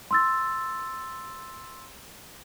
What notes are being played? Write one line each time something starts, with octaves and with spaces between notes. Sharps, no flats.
C6 E6 A6